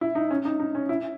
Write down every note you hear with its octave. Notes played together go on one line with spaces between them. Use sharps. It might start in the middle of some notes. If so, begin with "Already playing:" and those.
E4
D#4
C#4
D#4
D#4
C#4
E4